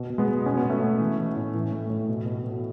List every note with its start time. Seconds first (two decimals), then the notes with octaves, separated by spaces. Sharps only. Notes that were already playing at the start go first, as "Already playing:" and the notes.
Already playing: B2
0.10 B2
0.18 G#3 B3
0.28 B2
0.46 B2 C#4
0.57 B3
0.63 B2
0.70 A3 C#4
0.82 B2
1.00 E3
1.19 E3
1.36 A2
1.54 E3
1.72 A2
1.90 A2
2.09 B2
2.26 B2
2.44 B2